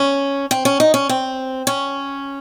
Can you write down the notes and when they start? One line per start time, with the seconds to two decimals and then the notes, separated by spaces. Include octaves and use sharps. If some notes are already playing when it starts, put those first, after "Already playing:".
Already playing: C#4
0.51 C4
0.65 C#4
0.80 D#4
0.94 C#4
1.09 C4
1.67 C#4